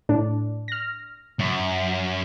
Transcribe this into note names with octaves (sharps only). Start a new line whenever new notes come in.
A2 D4
F6 A#6
F#2